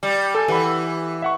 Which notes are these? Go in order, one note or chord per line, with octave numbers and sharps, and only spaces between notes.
G3
A4 G#5
E3 G4 F#5 B5
E5 F#5 C#6